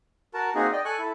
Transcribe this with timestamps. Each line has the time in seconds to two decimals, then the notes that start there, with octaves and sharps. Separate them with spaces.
0.34 F#4 A#4 A5
0.55 A#3 C4 D#4 F#4 G#4
0.72 D5 D#5 G5
0.85 A4 G#5 C#6 F#6
0.99 E4 A4